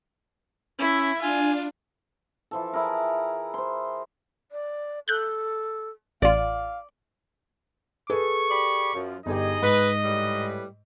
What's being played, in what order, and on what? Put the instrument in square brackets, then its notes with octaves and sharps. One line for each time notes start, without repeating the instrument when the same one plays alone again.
[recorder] C#4 [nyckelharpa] E4 E5
[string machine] D4 [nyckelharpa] F4 [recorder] G#5
[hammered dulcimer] E3 F3 A4
E4 G#4 A#4
C5 C6
[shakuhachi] D5
[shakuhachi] A4 [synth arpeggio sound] F#6 G6
[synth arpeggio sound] A1 F4 [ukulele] D5 [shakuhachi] F5
[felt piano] G#4 A4 B4 [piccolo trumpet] C#6
[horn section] G4 D5 B5
F#2 F3
[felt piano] G1 G4 [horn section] D#4 G#4 [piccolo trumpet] D#5
[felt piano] G#2 [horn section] B4
[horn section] A2 G3 B4